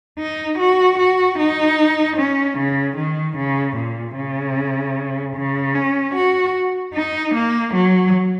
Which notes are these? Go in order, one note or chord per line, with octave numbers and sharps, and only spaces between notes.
D#4
F#4
F#4
D#4
C#4
C#3
D#3
C#3
A#2
C#3
C#3
C#4
F#4
D#4
A#3
F#3